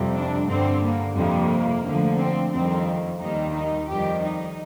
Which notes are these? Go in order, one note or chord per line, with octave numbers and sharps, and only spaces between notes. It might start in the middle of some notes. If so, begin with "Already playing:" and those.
Already playing: F2 C3 G3
D4
G2 D3 G3 C4
A#3
F2 C3 G3 A#3
D2 D3 F3
C4
F2 D#3 G3 C4
D#2 D#3 G3 D#4
D#4
F2 D#3 G3 G4
D#4